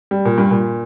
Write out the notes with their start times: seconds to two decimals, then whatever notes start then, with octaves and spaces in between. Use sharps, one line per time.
0.11 G3
0.25 A#2
0.38 G2
0.51 A#2